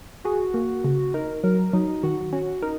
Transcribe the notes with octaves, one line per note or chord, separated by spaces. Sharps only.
F#4 G#4
A#3
C#3
D#4 A#4
F#3 A#4
F#3 D#4
D#3 F#4
C#4 F#4
D#4 A#4